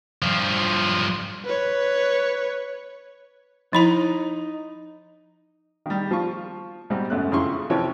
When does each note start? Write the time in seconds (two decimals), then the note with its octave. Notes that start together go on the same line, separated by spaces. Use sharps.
0.22 G2 F3
1.45 B4 C#5
3.73 F3 D#4 E4 A#5
5.86 D#3 G3
6.11 F3 F4 C#6
6.90 G#2 B2 G3 C4
7.10 C#2 F#2 A3 F#6
7.32 F2 C#3 E4 C6 C#6
7.70 C3 E3 F3 C#5 G5